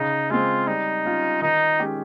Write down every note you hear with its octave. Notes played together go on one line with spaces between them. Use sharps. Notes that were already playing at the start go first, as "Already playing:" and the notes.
Already playing: C#3 D#4
G#3 C4 F4
G3 D#4
C#4 F4
D#3 D#4
G#3 C#4 G4